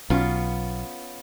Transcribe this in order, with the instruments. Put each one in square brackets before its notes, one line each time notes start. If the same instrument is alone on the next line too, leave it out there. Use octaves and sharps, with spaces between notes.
[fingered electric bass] B1 [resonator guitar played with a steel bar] B3 C#4 F4